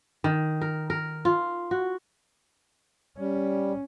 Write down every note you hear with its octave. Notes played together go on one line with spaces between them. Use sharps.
D#3
A#4
A#4
F4
F#4
G3 C#4